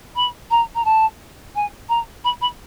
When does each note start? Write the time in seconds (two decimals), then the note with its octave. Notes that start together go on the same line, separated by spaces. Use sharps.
0.16 B5
0.51 A#5
0.75 A#5
0.85 A5
1.55 G#5
1.89 A#5
2.24 B5
2.41 B5